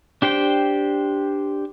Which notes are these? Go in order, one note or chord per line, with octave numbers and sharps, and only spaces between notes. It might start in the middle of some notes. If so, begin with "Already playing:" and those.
D4 G4 C5 G5